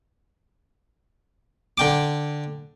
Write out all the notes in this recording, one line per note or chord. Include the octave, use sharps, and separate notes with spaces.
D3 G5 D6